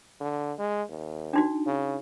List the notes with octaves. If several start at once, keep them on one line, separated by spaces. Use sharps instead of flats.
D3
G#3
D#2
D4 D#4 F#4
C#3